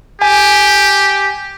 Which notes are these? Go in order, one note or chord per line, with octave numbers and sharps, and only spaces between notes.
G4 G#5